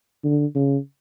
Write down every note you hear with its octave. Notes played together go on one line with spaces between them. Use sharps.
D3
C#3